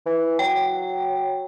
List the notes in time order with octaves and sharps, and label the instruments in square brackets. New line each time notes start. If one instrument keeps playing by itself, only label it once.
[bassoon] E3
[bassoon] F#3 [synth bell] G5